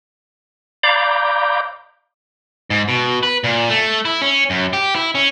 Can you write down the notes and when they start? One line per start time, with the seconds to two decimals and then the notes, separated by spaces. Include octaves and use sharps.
0.83 D5 F5 A#5 B5 D6 G6
2.70 G#2
2.88 B2
3.23 B4
3.44 A#2
3.70 A3
4.05 E4
4.22 C#4
4.50 F#2
4.73 G4
4.95 E4
5.15 C#4